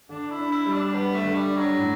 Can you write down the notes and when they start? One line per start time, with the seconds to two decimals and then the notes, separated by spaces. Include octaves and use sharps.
0.09 D3 D4
0.31 E4
0.38 D4
0.52 E4
0.66 G3
0.72 D4
0.93 G3 B3
1.15 A3
1.22 D3
1.36 G3
1.50 D4
1.57 F#3
1.78 A2